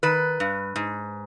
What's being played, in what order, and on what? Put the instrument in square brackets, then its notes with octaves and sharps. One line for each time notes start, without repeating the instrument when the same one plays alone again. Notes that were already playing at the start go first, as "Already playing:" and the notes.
[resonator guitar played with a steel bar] D#3 B4
G2
G#2